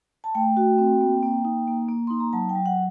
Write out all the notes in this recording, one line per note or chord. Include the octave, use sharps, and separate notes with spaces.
A5
A3 G5
F#4
C4
A#3
A#3
D#4
A#3
A#3
D#4 C6
A#5
F#3 A5
G5
F#3
F#5